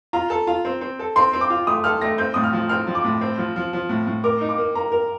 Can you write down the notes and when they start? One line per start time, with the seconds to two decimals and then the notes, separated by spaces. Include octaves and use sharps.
0.13 F4 A#5
0.30 A4
0.47 F4
0.65 C4
0.81 C4
0.99 A4
1.16 C4 C6
1.33 C4
1.41 D6
1.50 F4
1.67 A3 D#6
1.84 A4 F6
2.01 A3 A#6
2.18 C4 G6
2.34 A2 D#6
2.44 F6
2.53 F3
2.69 C4 F6
2.87 F3
2.95 D6
3.04 A2
3.21 C4
3.38 F3
3.56 F3
3.73 F3
3.89 A2
4.07 A2
4.24 A#4 D6
4.41 D#4
4.49 D6
4.58 A#3
4.75 A#3 A#5
4.92 A#4